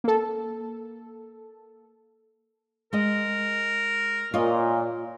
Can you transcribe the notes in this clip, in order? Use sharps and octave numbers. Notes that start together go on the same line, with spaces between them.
A#3 A4
G#3 A#4 D#5
A#2 F4 C#5 D#5